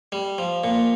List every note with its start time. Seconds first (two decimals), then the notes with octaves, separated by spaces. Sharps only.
0.12 G3
0.38 F3
0.64 A#2